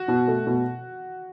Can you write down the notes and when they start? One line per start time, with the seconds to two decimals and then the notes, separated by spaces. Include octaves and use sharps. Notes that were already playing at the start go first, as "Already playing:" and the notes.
Already playing: F#4
0.08 B2
0.28 A3
0.47 B2